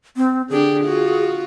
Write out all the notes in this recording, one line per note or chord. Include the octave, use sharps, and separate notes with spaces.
C4
D3 D4 G4 G#4
F4 F#4